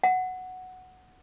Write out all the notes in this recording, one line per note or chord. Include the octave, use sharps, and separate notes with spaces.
F#5